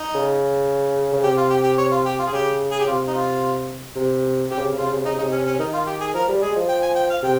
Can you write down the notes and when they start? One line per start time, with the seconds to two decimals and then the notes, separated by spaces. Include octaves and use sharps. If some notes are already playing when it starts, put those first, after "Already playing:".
Already playing: D#4
0.15 C#3
1.13 C#3
1.23 C3 G4
1.37 F4
1.50 G4
1.64 G4
1.78 C#5
1.91 F4
2.06 G4
2.19 F4
2.27 G#4
2.33 C#3 G4
2.71 G#4
2.80 G4
2.87 C3 F4
3.07 D#4
3.14 F4
3.96 C3
4.50 C3 G4
4.57 C#3
4.65 C3
4.72 C#3
4.78 C3 F4
4.86 C#3
4.94 C3
5.01 C#3
5.05 C3 D#4
5.14 C#3
5.18 D#4
5.22 C3
5.32 C#4
5.47 C#4
5.59 D#3 D#4
5.73 F4
5.87 G4
6.01 G#4
6.14 F3 A#4
6.29 G3
6.42 G#3 G#4
6.56 F3
6.69 G5
6.83 G#5
6.96 G5
7.10 F5
7.23 C3 G5